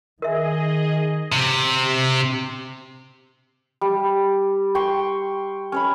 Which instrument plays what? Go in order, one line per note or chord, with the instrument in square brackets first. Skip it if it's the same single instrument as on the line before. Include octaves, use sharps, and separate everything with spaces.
[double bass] D#3 [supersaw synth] G#4 D#5 [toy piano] A#4 E5
[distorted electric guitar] C3
[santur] G3
G5 C6 C#6
C#4 C#5 B5